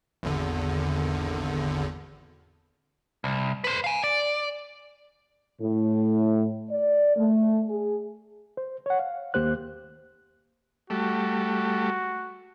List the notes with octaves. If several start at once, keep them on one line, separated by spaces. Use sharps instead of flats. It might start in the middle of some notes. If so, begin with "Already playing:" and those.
G#1 E2 D3
C2
B4 C5
F5 G#5
D5
A2
D5
A3
G#4
C5
C#5 F#5
F5
D#2 A#3 G4 C5 F#6
G3 A3 F#4